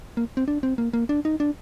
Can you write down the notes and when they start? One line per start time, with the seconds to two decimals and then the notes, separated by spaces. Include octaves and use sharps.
0.17 A#3
0.37 C4
0.48 D4
0.63 C4
0.78 A#3
0.93 A#3
1.09 D4
1.25 D#4
1.40 D4